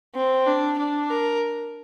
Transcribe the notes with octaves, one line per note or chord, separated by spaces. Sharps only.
C4
D4
D4
A#4